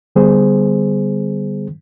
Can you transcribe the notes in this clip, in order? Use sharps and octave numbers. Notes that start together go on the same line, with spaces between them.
D3 G3 B3 G#4 C5